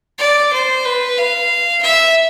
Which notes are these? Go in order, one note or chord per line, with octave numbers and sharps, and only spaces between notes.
D5
C5
B4
F5
E5